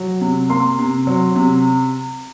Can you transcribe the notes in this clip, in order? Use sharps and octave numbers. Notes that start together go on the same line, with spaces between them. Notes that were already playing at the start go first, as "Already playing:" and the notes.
Already playing: F#3
C3
A#3 C6
C3
F#3
C3